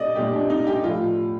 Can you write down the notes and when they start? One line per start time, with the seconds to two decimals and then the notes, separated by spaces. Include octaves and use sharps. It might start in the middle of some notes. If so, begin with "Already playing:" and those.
Already playing: A#2 D5 D#5
0.15 A#2 G3 G4
0.33 D4
0.50 D#4
0.67 G4
0.84 A2 F3 F4